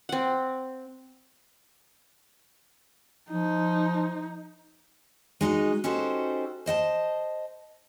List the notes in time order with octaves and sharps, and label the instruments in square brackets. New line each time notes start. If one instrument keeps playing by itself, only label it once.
[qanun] C4 F#5
[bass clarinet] F3 [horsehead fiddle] D#4
[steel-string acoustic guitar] G#3 D#4 F#4 D#5
C#4 D#4 F#4 G4 A4 C5
C5 D#5 F#5 A5